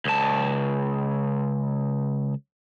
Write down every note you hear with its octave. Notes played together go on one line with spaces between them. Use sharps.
C#2 A5